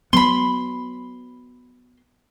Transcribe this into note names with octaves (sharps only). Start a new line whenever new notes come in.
F#3 B3 B5 C6